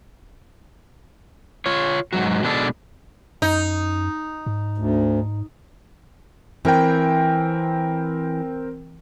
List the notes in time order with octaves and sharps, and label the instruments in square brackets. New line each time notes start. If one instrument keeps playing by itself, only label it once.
[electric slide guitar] F4 C#5
G#2 B2 F#3 F#4
B2 D#3 G#3 D4 E4 A4
[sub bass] F#2 [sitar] D#4
[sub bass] G#2
[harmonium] D2
[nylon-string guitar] E3 [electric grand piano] C4 A#4 G5